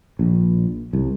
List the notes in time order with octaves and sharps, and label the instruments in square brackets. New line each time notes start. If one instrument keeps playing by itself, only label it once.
[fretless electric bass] A#1
C2